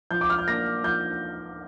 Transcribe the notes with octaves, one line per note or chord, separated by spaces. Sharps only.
F3 G6
D6
F6
G6
A#3 D4 A#6
F3 G6